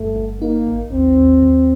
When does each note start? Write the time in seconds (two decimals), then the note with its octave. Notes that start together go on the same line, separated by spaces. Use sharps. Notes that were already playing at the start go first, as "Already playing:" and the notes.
Already playing: G1 G2 A3
0.16 G1
0.41 A#3 D#4
0.67 A1
0.92 D#2 C4
1.18 D#2
1.43 D#2